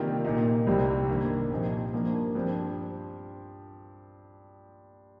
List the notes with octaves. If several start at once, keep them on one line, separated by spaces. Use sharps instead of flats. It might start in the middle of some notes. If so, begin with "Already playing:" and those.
Already playing: C3 D#3 G3 A#3 F4
A#2 A#3 D#4
C2 C3 G3 C4
G2 D#3 A#3
A#2 F3 C4 D#4
G2 F3 A#3
G2 F3 C4